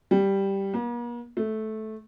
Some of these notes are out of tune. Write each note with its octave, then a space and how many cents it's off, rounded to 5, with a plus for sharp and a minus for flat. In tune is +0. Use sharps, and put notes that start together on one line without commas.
G3 +0
A#3 +45
A3 -15